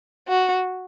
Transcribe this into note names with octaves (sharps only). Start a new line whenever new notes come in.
F#4